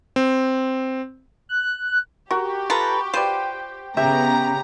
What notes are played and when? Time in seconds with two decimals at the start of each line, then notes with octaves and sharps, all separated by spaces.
0.16 C4
1.49 F#6
2.31 F#4 G4 A#4
2.70 F4 A4 B4 A#5
3.13 F4 B4 C5 D5 G5
3.97 C#3 B3 G4 E5 A#5